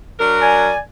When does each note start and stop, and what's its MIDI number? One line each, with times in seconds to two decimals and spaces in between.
0.19 0.69 54
0.19 0.69 62
0.19 0.69 70
0.41 0.77 74
0.41 0.77 80